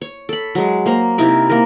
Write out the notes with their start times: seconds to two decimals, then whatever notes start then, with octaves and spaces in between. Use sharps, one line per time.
0.01 C#5
0.29 A4 B5
0.55 F#3 G#3
0.86 A#3 C5 A#5
1.18 C3 D#4 E4 A#4
1.50 A#3 A#4